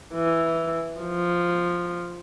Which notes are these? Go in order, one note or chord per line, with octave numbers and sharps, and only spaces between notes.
E3
F3